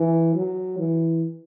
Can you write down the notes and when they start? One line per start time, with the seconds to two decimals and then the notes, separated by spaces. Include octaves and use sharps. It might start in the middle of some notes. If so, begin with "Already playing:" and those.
Already playing: E3
0.35 F#3
0.78 E3